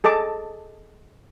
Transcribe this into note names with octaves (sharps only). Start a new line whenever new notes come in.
G#4 A4 D#5 A5 D6